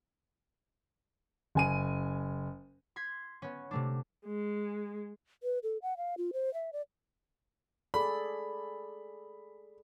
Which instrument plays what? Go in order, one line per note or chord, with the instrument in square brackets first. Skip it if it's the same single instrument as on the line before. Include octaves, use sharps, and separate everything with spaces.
[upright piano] F#1 G#5 D#7
[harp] C6 G#6 B6
B3 C#4
C3 A3 D4
[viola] G#3
[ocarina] B4
A4
F#5
F5
F4
C5
E5
D5
[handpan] G#4 A4 D5 [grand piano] B5